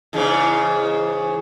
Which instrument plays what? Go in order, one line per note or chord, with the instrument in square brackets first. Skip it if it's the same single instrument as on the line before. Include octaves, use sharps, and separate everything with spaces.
[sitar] E2 G#2 C#3